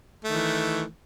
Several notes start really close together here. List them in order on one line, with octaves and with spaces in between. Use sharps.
A3 D#3 E3